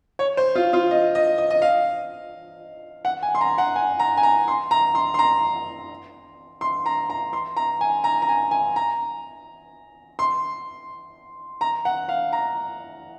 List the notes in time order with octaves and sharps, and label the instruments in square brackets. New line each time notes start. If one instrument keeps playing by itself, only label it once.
[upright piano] C#5
C5
F4
F4
D#5
D#5
D#5
D#5
F5
F#5
G#5
C6
A#5
F#5
G#5
A#5
G#5
A#5
C6
A#5
C6
C6
A#5
C6
A#5
A#5
C6
A#5
G#5
A#5
A#5
G#5
G#5
A#5
C6
A#5
F#5
F5
A#5